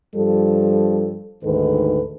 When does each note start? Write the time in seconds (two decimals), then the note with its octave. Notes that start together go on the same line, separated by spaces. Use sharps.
0.16 G2 F3 G3 A4
1.43 D2 G#2 D#3 A4 B4